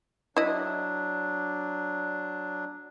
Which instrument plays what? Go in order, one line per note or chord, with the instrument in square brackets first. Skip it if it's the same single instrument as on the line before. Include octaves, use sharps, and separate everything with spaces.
[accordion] F#3 D4 [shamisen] E4 D#5